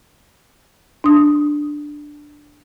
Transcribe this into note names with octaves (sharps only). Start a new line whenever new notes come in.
D4 D#6